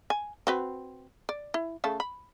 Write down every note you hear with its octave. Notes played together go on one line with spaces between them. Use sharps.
G#5
C4 F#4 B4
D5
E4
C#3 A3 A5
B5